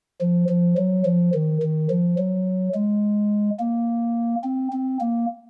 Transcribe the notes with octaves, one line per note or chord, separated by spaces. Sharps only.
F3
F3
F#3
F3
D#3
D#3
F3
F#3
G#3
A#3
C4
C4
A#3